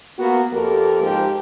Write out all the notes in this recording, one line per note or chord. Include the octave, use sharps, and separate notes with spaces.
A#3 B3 F#4
F2 A#3 G4 A4 A#4
G#2 F3 G4